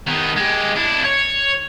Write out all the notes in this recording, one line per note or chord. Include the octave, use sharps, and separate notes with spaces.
D#3 B3
G#3 G4
D4 E4
C#5